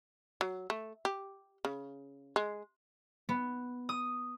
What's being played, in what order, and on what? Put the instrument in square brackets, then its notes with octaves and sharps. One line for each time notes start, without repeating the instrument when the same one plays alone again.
[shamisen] F#3
A3
G4
C#3
G#3
[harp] B3
D#6